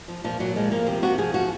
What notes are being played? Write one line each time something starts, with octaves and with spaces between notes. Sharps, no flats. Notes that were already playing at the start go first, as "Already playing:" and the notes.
F3
A#2 F3
A#2 F#3
F3 G#3
F3 A#3
C3 C4
C3 F#4
F3 G#4
F3 F#4